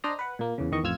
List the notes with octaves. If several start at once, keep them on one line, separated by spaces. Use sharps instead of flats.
D4 C5 D5 D#5 A#5
B4 F#5
A#2 A#3
E2 C#3
E2 D#3 D#5 C#6
A1 F2 F4 E6 F6 G#6